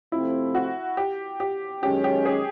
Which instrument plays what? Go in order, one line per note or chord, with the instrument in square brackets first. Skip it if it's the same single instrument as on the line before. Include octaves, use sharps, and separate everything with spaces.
[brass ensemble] C3 F3 A3 C4 [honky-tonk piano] E4
[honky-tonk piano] F#4
G4
G4
[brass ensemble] F#2 D#3 G#3 C#4 [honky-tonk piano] G4
[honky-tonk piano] G4
G#4